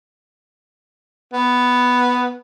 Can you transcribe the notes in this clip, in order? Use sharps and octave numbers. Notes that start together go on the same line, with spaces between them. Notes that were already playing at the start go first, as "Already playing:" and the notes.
B3